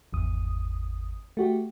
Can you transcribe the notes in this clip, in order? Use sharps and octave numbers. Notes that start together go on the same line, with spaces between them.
G#1 E2 D#6
A3 F#4 G4